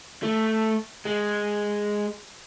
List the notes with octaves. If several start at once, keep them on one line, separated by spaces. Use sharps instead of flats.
A3
G#3